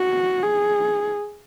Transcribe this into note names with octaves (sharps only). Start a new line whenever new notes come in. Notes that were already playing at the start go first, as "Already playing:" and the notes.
Already playing: F#4
G#4